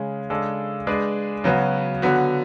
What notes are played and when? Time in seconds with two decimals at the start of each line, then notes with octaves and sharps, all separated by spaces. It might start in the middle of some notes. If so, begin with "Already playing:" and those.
Already playing: C#3 G#3 C#4
0.30 C#3 G#3 D4 A4
0.87 G#3 D4 G#4 B4
1.44 C#3 F#3 B3 F#4 B4
2.02 D3 F#3 B3 F#4